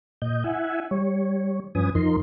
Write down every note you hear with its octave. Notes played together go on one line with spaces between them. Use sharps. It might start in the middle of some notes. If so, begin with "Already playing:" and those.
A#2 D#5 G6
E4 E5 F#5 G#5
G3 C#5
G2 F3 C#4 B4 G#5 D#6
F2 F3 D#4 A#4 C6